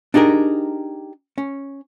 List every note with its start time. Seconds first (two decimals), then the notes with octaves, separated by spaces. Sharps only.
0.14 D4 D#4 G4 G#4 A#4
1.38 C#4